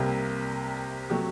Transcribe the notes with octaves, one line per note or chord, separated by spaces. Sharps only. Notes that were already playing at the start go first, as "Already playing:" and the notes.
Already playing: C2 C3 G3 A#3
C3 F#3 A3 G4